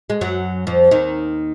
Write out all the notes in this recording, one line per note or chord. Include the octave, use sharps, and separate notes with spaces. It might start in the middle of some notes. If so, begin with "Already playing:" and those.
G#3
F#2 F#3
F2 F3
D#2 D#3